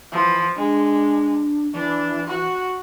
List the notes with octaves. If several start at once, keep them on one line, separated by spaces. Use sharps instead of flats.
E3 F3
G#3 D4
E3 D4
F#4